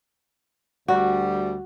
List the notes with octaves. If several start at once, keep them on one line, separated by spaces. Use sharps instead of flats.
D2 G3 F#4